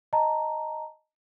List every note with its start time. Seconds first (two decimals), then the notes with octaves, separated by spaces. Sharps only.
0.13 D#5 A5 A#5